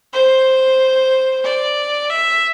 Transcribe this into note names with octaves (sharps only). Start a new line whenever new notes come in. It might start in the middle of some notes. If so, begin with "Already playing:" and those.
C5
D5
E5